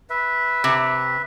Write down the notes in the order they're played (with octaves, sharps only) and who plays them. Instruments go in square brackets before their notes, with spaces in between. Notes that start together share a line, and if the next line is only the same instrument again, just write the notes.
[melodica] B4 E5
[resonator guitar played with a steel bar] C3